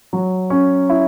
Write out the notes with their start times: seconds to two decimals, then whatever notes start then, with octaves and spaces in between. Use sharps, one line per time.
0.13 F#3
0.50 C#4
0.89 E4